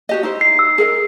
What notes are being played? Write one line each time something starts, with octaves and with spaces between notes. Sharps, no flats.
F#4 G4 D#5
D#4 E4 C5
C7
E6
G#4 A#4 D#5